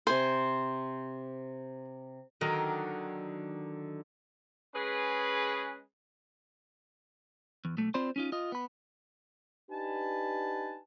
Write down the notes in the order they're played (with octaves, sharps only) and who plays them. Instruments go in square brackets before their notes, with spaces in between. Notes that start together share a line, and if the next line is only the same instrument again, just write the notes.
[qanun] C3 G#5 [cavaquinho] C5
[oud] D3 D#3 F#3
[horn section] G#3 C#4 G#4 B4
[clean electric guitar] E2
B1 A3
C4 F4 C5 D5 B5 C6
C#4 D#4 F4
F4 D#5
B3 B5
[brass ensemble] D4 D#4 G4 B4 G#5 A5